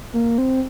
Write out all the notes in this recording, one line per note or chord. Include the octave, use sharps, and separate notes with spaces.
A#3
C4